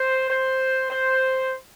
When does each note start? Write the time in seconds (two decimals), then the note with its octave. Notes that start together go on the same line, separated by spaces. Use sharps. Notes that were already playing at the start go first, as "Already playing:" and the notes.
Already playing: C5
0.30 C5
0.90 C5